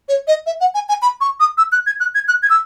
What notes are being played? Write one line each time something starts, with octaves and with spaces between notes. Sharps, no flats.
C#5
D#5
E5
F#5
G#5
G#5
B5
C#6
D#6
E6
F#6
G#6
F#6
G#6
F#6
G#6
E6